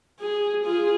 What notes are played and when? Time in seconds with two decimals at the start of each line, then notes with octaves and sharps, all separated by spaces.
0.21 G#4
0.66 F4 G#4